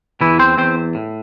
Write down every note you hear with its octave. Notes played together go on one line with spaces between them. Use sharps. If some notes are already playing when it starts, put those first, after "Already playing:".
E2 E3 E4
C4 C5
E2 C4 C5
A2